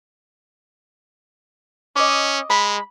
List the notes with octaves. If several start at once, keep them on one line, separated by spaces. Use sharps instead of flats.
C#4 D#5 D6
G#3 B5